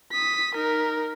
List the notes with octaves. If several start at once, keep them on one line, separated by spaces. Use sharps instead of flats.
D#6 B6
D#4 A#4